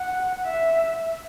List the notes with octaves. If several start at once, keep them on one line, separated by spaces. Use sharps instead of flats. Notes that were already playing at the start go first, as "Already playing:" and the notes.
Already playing: F#5
E5